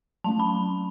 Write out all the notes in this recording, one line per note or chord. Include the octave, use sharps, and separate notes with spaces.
F#3 A3 C#4 A5
B5